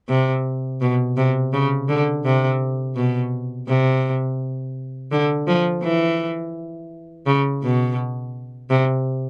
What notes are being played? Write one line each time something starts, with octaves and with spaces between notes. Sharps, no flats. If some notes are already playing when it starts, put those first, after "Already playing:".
C3
B2
C3
C#3
D3
C3
B2
C3
D3
F3
E3
C#3
B2
C3